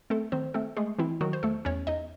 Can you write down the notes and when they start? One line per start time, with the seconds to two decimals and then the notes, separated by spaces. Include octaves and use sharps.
0.10 A3 C4 A4
0.32 D#3 C4 C5
0.54 A3 C4 A4
0.77 G#3 A3 G#4
0.99 E3 C4 E4
1.21 D#3 F#3 F#4
1.33 C5
1.43 E2 A3 A4
1.65 E2 C#4 C#5
1.87 E2 D#4 D#5